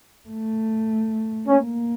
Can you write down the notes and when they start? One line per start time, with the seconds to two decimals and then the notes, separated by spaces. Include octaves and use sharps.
0.29 A3
1.47 A#3 C#4